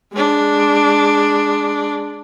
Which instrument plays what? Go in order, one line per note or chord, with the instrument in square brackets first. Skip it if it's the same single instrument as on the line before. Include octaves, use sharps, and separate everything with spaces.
[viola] G#3 D4